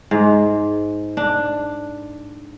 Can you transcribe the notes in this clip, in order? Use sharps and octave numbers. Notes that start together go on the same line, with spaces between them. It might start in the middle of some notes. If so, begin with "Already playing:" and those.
G#2
D4